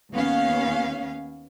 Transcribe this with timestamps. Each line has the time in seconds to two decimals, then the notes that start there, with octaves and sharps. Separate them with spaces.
0.12 D#2 B3 C#4 F5